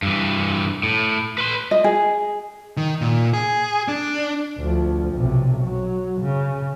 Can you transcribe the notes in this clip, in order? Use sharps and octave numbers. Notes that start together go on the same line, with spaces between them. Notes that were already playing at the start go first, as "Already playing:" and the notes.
G2 E3
A2
B4 C6
D#5
G#4
D#3
A#2
G#4
D4
D2 F3
B1 C3
F#3
C#3